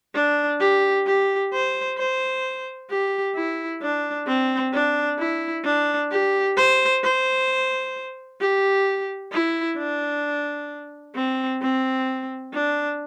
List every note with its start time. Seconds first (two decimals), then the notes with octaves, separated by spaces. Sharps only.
0.15 D4
0.60 G4
1.06 G4
1.53 C5
1.98 C5
2.90 G4
3.35 E4
3.82 D4
4.28 C4
4.74 D4
5.19 E4
5.65 D4
6.11 G4
6.57 C5
7.03 C5
8.40 G4
9.32 E4
9.78 D4
11.15 C4
11.62 C4
12.53 D4